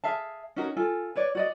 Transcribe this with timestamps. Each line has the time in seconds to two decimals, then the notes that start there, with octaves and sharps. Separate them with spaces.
0.04 G#4 E5 F5 A5
0.56 C#4 D#4 F#4 A#4
0.77 F4 A4 G#5
1.15 B4 C#5 D5
1.35 F#4 D5 D#5